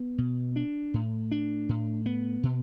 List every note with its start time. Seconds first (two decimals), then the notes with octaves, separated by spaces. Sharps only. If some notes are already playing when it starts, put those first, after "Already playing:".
Already playing: B3
0.18 B2
0.56 D4
0.94 A2
1.31 D4
1.69 A2
2.06 B3
2.43 B2